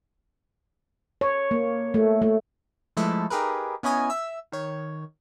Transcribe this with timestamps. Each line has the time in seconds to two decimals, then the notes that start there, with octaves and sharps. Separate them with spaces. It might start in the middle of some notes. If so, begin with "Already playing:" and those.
1.21 C#5
1.51 A#3
1.94 A3
2.22 A3
2.97 F3 G#3 A3 E4 A4 B4
3.30 D#4 G4 G#4 A#4 B4
3.83 B3 C#4 E4 C#5 D#5 G#5
4.10 E5 E6
4.52 D#3 C#5